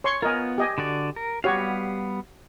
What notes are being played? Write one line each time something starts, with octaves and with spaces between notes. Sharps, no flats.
C#5 C6 C#6
B3 F4 A#4 D#5 G#5
G4 D#5 G#5
D3 F#4 D5
A#4
G3 B3 F#4 G4 C#5 F5